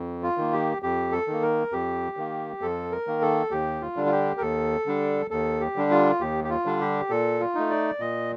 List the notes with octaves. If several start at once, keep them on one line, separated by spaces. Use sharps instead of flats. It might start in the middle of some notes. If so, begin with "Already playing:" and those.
Already playing: F2
F4
D#3 A#3
G4
F2 G4
A4
D#3 A#3
A#4
F2 G4
D#3 A#3
F2 A4
A#4
D#3 A#3
A4
D#2 G4
F4
D3 G3 D4
F4
G4
A#4
D#2 A4
D3 G3 D4
D#2 A4
G4
D3 G3 D4
F4
D#2 G4
G4
F4
D3 G3 D4
G4
A#2 A4
F4
A3 D#4
D5
A#2 D#5